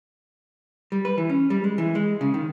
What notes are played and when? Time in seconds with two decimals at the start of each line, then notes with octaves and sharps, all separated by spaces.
0.92 G3
1.05 B4
1.18 E3
1.29 C#4
1.50 G3
1.64 G#3
1.78 E3
1.95 G#3
2.21 C#3
2.34 D#3